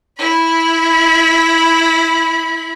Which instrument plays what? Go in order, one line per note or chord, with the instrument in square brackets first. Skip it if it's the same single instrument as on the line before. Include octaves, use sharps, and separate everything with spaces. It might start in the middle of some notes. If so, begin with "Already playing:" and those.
[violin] E4 B5